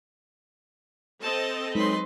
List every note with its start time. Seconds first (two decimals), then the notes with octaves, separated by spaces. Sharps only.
1.22 C4 A4 D#5 A5
1.75 F#3 G#3 D#4 B4 C6